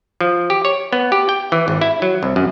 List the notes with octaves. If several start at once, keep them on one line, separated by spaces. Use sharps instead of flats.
F3
G4
C#5
B3
G4
G5
E3
G#1
E4
F#3
C2
F#2